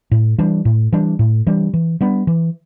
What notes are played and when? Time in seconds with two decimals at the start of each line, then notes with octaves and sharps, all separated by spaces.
0.11 A2
0.38 E3 G3 D4
0.65 A2
0.92 E3 G3 D4
1.19 A2
1.47 E3 G3 D4
1.74 E3
2.01 G3 B3 D4
2.27 E3